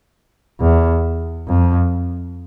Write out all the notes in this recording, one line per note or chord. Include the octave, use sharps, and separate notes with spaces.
E2
F2